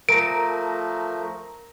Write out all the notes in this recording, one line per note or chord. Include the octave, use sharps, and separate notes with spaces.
F3 A3 A#4 A#5 A#6 D7